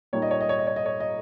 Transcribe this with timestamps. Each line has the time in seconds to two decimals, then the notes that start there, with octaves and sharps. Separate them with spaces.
0.13 A#2 G3 A#3 D#4 C#5
0.22 D#5
0.31 C#5
0.41 D#5
0.49 C#5
0.59 D#5
0.67 C#5
0.76 D#5
0.86 C#5
1.00 D#5